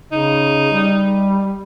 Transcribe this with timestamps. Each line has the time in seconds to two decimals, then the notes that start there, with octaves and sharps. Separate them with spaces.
0.12 C#3 D#4
0.72 G3